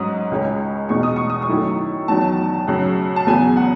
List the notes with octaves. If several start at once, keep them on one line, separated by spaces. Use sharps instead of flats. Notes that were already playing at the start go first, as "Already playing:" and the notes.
Already playing: G#2 F#3 C#4 D#6
C#2 C#3 G#3 C#4
E2 B2 G#3 D#4 C#6
D#6
C#6
D#6
C#6
F#2 D#3 A3 E4
E2 D#3 F#3 A5
F#2 C#3 F#3
A5
E2 C#3 F#3 B3 G#5
F#5